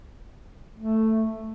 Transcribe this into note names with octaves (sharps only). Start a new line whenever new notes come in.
A3